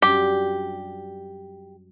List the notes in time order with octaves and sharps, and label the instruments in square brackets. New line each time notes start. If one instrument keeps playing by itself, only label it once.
[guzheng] F#2 G3 D4 [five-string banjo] G4